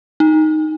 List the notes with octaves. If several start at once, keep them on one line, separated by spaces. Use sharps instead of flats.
D#4